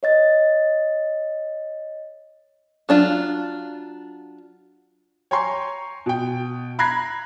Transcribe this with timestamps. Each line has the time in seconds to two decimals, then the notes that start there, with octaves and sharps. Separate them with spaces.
0.03 C#5 D#5 A6
2.89 F#3 D4 F4
5.31 C#5 G5 G#5 A#5 C6 C#6
6.06 B2 G5
6.79 A#5 B5 F#6 G#6 A#6 C7